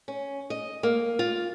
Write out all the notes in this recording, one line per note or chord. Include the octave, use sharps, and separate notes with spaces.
C#4
D#5
A#3
F4